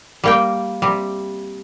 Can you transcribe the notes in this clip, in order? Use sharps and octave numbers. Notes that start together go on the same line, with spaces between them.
G3 A#3 G5
C3 G3